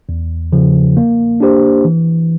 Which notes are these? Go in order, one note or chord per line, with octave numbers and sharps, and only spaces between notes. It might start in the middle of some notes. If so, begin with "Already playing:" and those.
E2
C#3 F3
A#3
D4 G4 C5
E3